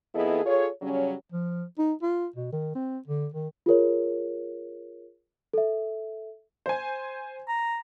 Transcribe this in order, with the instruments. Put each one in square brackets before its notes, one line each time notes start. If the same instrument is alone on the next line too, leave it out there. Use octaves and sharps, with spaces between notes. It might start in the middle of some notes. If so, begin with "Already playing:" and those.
[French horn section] F2 B3 E4 G#4 A4 D#5
F4 G#4 A4 C#5
C#3 F#3 G3 C#4
[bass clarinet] F3
D#4
F4
B2
D#3
C4
D3
D#3
[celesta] F4 G#4 A#4 C#5
A4 E5
[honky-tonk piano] C5 G#5
[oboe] A#5